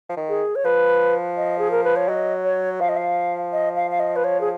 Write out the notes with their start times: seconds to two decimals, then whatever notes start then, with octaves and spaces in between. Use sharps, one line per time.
0.09 F3
0.17 D#3
0.29 G#4
0.55 C#5
0.65 F3 B4
1.37 D#5
1.59 G#4
1.71 A#4
1.84 B4
1.96 C#5
2.08 F#3 D#5
2.44 C#5
2.80 F3 F5
2.89 D#5
2.97 F5
3.52 D#5
3.76 F5
3.91 F5
4.00 D#5
4.16 B4
4.24 C#5
4.41 G#4